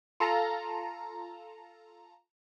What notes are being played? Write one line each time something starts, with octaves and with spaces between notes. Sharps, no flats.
F4 A4 A5 A#5